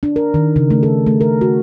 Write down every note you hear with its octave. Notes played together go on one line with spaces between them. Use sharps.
D4
A#4
D#3
C#3
A3
A4
A3
A#4
F#4